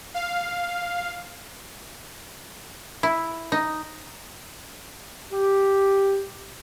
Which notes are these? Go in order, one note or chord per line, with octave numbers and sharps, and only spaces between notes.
F5
E4
D#4
G4